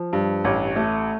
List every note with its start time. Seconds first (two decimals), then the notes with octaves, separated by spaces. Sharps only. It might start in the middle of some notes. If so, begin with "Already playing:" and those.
Already playing: F3
0.13 G2
0.45 A1
0.76 A3